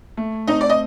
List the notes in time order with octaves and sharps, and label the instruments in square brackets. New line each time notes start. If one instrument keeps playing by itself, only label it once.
[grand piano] A3
[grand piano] C4 [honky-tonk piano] D#4 D#5
[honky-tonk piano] D5
D#5